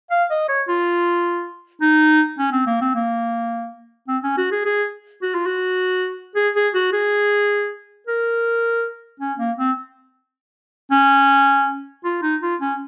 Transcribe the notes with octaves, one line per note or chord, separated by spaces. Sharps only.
F5
D#5
C#5
F4
D#4
C#4
C4
A#3
C4
A#3
C4
C#4
F#4
G#4
G#4
F#4
F4
F#4
G#4
G#4
F#4
G#4
A#4
C#4
A#3
C4
C#4
F4
D#4
F4
C#4